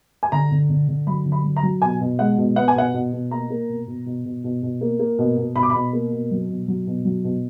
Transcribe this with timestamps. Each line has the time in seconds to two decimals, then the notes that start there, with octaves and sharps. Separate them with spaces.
0.23 G#5
0.32 D3 A#5
0.51 D3
0.70 D3
0.88 D3
1.07 F#3 B5
1.25 D3
1.32 B5
1.44 F#3
1.57 A#5
1.63 F#3
1.82 B2 G#5
2.00 B2
2.19 G#3 F#5
2.38 B2
2.56 B3 F#5
2.68 G#5
2.75 B2 F#5
2.94 B2
3.13 B2
3.31 A#3 A#5
3.50 A#3
3.69 B2
3.87 B2
4.06 B2
4.25 B2
4.44 B2
4.62 B2
4.81 A#3
4.99 A#3
5.18 B2
5.37 B2
5.55 B2 B5
5.63 D6
5.70 B2 B5
5.93 A#3
6.12 B2
6.31 F#3
6.49 B2
6.68 F#3
6.87 B2
7.05 F#3
7.24 B2